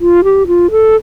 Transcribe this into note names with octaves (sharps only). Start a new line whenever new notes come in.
F4
G4
F4
A4